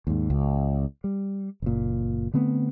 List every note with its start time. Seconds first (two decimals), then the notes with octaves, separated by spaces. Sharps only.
0.07 D#2 G#2
0.30 C#2
1.04 G3
1.62 F#1 A#2
2.34 D3 A3 B3 C4